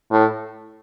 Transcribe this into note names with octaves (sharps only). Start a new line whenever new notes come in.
A2